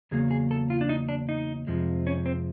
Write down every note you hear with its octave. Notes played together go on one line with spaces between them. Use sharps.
E2 C#3 F#3 A#3 G#4
G#4
A4
F4
D4
D#4
D4
D#4
F2 C3 F3 G#3
C#4
C4